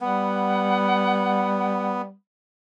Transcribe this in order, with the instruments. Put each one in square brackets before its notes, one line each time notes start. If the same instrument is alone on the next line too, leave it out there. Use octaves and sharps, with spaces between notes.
[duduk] G3 [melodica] B3 [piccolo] F#5